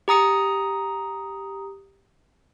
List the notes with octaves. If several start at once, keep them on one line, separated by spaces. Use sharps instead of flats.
G4 A#5 D#6 C#7